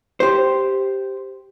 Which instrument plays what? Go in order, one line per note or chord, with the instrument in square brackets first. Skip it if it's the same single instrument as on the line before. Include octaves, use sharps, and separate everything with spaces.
[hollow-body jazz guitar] G4 C5